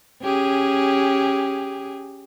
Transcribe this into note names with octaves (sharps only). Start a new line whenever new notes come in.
C#4 G4 G#4